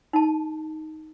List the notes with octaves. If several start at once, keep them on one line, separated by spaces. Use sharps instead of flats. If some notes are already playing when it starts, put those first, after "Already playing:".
D#4 A5